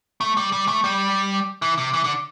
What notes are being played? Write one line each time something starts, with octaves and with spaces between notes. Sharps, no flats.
A3
G3
G3
A3
G3
E3
C3
E3
D3